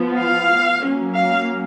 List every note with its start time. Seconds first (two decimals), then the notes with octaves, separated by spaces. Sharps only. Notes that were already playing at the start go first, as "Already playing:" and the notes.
Already playing: F3 B3
0.22 F5
0.83 F#3 A#3 C#4
1.15 F5